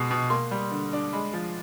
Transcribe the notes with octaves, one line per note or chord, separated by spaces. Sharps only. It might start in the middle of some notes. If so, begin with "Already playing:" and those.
Already playing: B2 G#3
B2
A#3 C6
G3
D3
D4
G#3 B5
F3